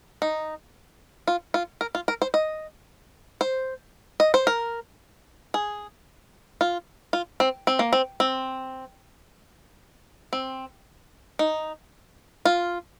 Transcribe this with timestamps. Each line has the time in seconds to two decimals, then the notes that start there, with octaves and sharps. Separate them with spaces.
0.22 D#4
1.28 F4
1.54 F4
1.81 A#4
1.95 F4
2.08 A#4
2.22 C5
2.34 D#5
3.41 C5
4.20 D#5
4.34 C5
4.47 A#4
5.54 G#4
6.61 F4
7.13 F4
7.40 C4
7.67 C4
7.79 A#3
7.93 C4
8.20 C4
10.33 C4
11.39 D#4
12.45 F4